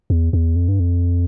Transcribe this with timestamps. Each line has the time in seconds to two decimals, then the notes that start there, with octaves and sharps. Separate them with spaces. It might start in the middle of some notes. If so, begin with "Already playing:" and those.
0.10 E2
0.33 E2
0.56 F2
0.68 G2
0.80 F2